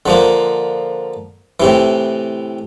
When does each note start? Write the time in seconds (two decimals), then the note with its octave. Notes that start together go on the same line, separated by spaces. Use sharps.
0.06 D3 F3 A#3
1.60 A2 C3 E3